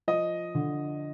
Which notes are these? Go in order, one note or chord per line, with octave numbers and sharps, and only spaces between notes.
F3 D#5
D3